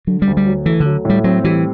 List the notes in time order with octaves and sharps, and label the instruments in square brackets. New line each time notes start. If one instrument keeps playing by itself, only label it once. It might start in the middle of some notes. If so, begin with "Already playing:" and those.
[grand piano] D3 [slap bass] F#3
[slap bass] G3
[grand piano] D2
[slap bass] G3
[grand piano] F#3
[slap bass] E3 [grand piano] A3
[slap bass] D3
[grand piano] F#3
[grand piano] A2 [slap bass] G3
[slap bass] F#3 [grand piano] C4
[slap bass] E3 [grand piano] G3